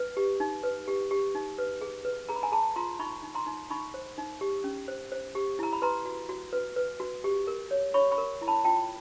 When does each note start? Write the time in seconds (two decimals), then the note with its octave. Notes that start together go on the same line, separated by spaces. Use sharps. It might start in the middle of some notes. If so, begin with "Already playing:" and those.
Already playing: B4
0.17 G4
0.40 D#4
0.63 B4
0.88 G4
1.11 G4
1.35 D#4
1.58 B4
1.82 G#4
2.05 B4
2.29 G#4 A#5
2.36 B5
2.43 G#5 A#5
2.52 G#4 A5 B5
2.76 F4 A#5 C6
2.99 D#4 B5 C#6
3.23 D#4
3.35 A#5 C6
3.47 D#4
3.70 D#4 B5 C#6
3.94 C5
4.18 D#4
4.41 G4
4.64 C#4
4.88 C5
5.12 C5
5.35 G4
5.59 E4 A#5
5.73 B5
5.82 B4 A#5 C6
6.06 F#4
6.29 F#4
6.53 B4
6.76 B4
7.00 F#4
7.24 G4
7.47 A#4
7.71 C#5
7.94 C#5 B5 C#6
8.11 B5 C#6
8.18 A#4
8.42 E4
8.48 A5 B5
8.64 F4 G5 A5